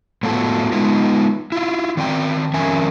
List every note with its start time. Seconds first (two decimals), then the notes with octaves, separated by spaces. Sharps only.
0.23 A2 F#3 B3 F4 F#4 A4
0.72 G#3 B3 D#4 F4
1.52 E4 F4
1.97 D#3 C4 D5 E5 G5
2.54 F2 D#3 C#4 A#4 E5 G#5